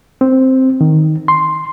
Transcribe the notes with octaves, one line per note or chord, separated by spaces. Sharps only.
C4
D#3
C6